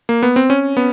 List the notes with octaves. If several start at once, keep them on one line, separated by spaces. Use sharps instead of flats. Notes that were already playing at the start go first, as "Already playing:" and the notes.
A#3
B3
C4
C#4
B3